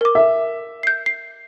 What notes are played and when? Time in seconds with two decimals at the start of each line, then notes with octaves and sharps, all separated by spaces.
0.01 A#4 D6
0.15 E5
0.83 G6 C7
1.06 C7